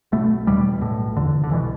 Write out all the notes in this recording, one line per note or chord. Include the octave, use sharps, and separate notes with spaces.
B1 B2 A3
E1 E2 B2 G3
B1 A2
F1 E2 D3
D3
C2 B2 E3